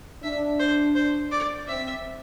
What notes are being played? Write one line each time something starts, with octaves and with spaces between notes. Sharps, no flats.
D4 E5
C5
C5
D5
C4 E5